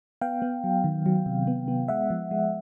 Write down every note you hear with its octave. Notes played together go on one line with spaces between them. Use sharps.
B3 F5 G5
B3
F#3
D#3
F#3
C3
B3
B3
G#3 E5 F#5
F3
G#3